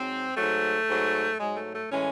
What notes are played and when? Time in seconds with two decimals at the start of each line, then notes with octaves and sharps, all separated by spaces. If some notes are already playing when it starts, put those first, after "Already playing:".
Already playing: G#2 F#3 C4
0.36 G#2 F#3 A3
0.89 G#2 F#3
1.39 G#2 F#3 G#3
1.57 A3
1.74 A3
1.91 A2 E3 G#3 C#4